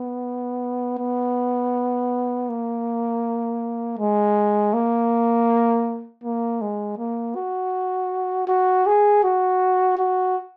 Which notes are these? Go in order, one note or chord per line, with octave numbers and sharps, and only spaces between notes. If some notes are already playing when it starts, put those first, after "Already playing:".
Already playing: B3
B3
A#3
G#3
A#3
A#3
G#3
A#3
F#4
F#4
G#4
F#4
F#4